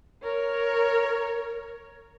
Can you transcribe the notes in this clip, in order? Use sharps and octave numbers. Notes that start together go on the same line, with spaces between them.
A#4 C#5